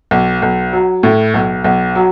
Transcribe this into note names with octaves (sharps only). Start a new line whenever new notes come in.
B1
B1
F#3
A2
B1
B1
F#3